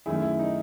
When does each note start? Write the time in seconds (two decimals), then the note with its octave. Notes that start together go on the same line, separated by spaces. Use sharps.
0.06 F#2 D#3 A3 E4 G#4
0.22 E4
0.39 D#4